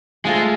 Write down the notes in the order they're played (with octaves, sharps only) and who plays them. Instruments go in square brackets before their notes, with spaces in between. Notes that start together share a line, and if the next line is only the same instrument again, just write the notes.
[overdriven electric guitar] G#3 [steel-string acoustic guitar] A3 F4 G#4